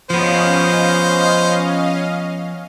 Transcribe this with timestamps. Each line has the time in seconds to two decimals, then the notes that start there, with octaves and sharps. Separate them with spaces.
0.10 F3 B3 C#4 C5 D#5 F5